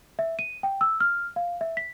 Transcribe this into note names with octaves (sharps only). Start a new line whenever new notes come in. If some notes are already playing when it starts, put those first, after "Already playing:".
E5
D#7
G5
E6
F6
F5
E5
B6